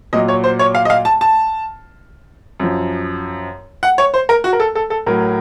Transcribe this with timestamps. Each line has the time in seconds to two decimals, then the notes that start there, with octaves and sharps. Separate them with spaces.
0.13 A#2 F#3 D#5
0.28 C#5
0.44 C5
0.59 C#5
0.75 F5
0.85 D#5
0.90 F5
1.05 A5
1.21 A5
2.60 F#2 F3
3.83 F#5
3.98 C#5
4.14 C5
4.29 A#4
4.44 F#4
4.53 A#4
4.60 A4
4.75 A4
4.90 A4
5.06 A2 F#3 A#4